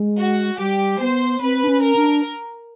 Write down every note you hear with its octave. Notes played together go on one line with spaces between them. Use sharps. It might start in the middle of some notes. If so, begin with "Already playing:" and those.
Already playing: G#3
F#4
G3 G4
B3 C5
C4 B4
D4
C#4
A#4
D4